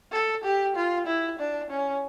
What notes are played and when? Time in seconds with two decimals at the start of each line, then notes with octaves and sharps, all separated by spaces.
0.12 A4
0.44 G4
0.76 F4
1.07 E4
1.39 D4
1.70 C#4